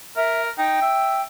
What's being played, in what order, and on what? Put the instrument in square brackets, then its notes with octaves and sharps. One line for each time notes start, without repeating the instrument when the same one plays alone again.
[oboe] A#4 [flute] E5
[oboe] D#4 [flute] G5
[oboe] E5